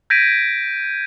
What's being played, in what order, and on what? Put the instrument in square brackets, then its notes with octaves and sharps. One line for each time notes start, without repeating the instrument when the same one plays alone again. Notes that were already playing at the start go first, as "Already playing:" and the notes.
[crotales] G6 G#6 A#6 B6 D7 D#7